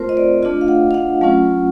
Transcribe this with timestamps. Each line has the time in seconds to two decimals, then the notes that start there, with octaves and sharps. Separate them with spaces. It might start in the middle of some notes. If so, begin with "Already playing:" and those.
Already playing: A3 C4 F4 A#4 C5
0.09 D#5
0.17 D5
0.42 A3 D4 F4 D#5
0.61 F5
0.68 F#5
0.91 F5
0.94 F#5
1.21 F#3 A3 C#4 F4